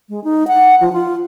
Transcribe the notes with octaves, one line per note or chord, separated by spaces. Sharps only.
G#3
D#4
F#5
F3
F4